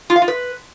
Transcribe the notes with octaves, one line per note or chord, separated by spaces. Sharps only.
F4
F5
F4
B4